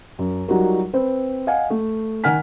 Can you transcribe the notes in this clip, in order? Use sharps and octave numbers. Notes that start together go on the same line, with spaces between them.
F#2
F#3 G3 D#4 F4 F#4 A#4
C4 B4 C5
D#5 F5 F#5 G#5
A3
D#3 A#4 F#5 G#5 F6 B6